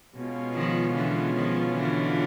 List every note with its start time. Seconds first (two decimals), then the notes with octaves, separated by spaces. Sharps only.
0.15 B2 G#3 C#4 F4
0.54 D#3 F3
0.94 D3 E3
1.35 D#3 F3
1.75 D3 E3